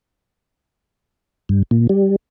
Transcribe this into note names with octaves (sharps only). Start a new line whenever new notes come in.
G2
A#2
G3